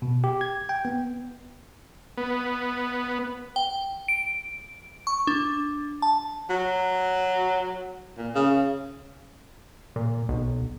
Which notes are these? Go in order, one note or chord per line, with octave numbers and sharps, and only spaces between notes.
B2
G4
G#6
G5
B3
B3
G5
D7
C#6
D4
A5
F#3
A#2
C#3
A#2
B1